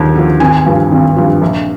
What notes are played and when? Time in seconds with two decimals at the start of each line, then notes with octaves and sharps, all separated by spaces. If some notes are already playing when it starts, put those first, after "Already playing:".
Already playing: D#2 D3 F3
0.16 D3 F3
0.40 G#1 G#5
0.57 G#5
0.66 G2 F3
0.92 G#1
1.16 G2 F3
1.42 A#1